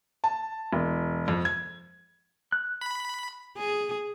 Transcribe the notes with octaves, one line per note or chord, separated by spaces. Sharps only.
A5
E1
F2
G#6
F#6
B5
G#4